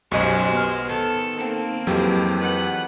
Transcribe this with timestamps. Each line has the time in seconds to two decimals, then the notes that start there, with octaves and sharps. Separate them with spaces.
0.11 B1 F#2 G#3 F#4 G4 C5 D#5
0.53 B3 F6
0.89 D#3 A4
1.38 A#3 C4
1.87 F2 E3 F#3 G#3 G4 A4
2.38 B4 F#5